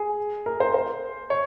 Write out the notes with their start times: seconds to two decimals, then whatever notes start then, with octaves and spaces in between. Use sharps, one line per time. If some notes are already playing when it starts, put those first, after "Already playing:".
Already playing: G#4
0.46 A#4
0.60 C5
0.74 C5
1.30 C#5